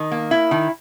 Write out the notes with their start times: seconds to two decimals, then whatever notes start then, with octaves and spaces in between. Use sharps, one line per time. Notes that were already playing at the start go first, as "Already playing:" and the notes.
Already playing: D#3
0.11 A#3
0.31 E4
0.51 D#3